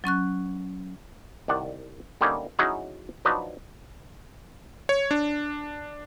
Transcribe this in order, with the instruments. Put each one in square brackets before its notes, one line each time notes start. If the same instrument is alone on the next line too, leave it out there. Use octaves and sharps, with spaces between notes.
[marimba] F#3 C#4 C#6 F#6
[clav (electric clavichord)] C2 D#3 D5 F#5
D3 G3 A#3 C#4 D#4
F#3 C#4 D#4 E4 F#4 G#4
F3 F#3 D4 D#4 B4
[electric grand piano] C#5
D4